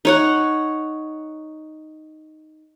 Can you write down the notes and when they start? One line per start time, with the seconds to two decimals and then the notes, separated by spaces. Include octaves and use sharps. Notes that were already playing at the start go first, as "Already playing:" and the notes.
0.05 D#4 C#5 F#5